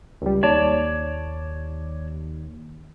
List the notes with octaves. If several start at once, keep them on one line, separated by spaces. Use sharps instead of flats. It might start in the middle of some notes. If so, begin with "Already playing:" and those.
C#2 G3
D#2 C#5 D5 A5